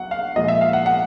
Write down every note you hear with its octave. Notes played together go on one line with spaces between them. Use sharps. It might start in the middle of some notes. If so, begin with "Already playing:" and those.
Already playing: F#3 F#5
F5
A#2 F3 G#3 D#5
E5
F5
F#5
F#5